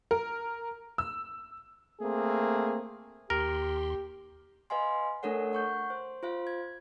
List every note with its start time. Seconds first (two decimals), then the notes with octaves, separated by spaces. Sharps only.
0.11 A#4
0.98 E6
2.01 A3 A#3 C4 G#4
3.30 D#2 G4 A#4 C6
4.70 B4 D#5 F5 G#5 C6
5.23 A3 D4 A4 A#4 C#5 F#5
5.53 F#5 C#6 G6
5.90 C5
6.23 F4 C5 F5
6.47 G#6